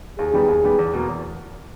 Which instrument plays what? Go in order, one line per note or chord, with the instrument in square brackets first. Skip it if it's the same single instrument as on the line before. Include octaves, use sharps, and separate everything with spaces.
[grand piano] D#2 [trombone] G#4
[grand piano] D#3 G3 B3 G4
D#2
D#3 G3 B3 G4
E2
B2 A#3
E2